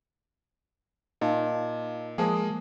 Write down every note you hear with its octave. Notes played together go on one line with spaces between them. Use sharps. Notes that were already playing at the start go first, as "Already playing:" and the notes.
A#2 D#4 D#5 F5 A5
F3 G#3 A#3 G#4 A5 D#6